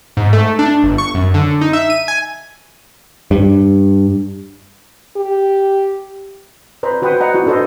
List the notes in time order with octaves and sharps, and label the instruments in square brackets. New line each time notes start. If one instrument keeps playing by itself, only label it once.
[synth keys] G#2
A3
D4
G1
C#6
F#2
D3
D#4
E5
D#7
G#5
[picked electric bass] G2
[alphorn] G4
[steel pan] B4 C5 D5 A#5 B5
F#4 B4 C5 F#5 G5 D#6
D5 D#5 F#5 A#5
E4 F#4
D4 A4 B4 C5 D#5